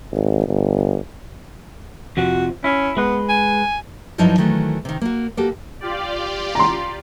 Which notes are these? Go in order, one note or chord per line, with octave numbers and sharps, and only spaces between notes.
G#1
G1
F2 C3 F3 F#4
C#4 E4
G#3 B3 B4
G#5
G2 F3 F#3 D#4 E4 A5
D#3 E3 F#3 A3
C3 D#3
A#3 F#4
A#3 F#4 G4 A4
F4 G4 D5
A#5 C6